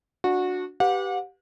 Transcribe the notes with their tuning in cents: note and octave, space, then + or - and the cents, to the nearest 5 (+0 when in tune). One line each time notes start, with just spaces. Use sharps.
D4 +0 F#4 -20
G4 -10 B4 +0 F#5 -40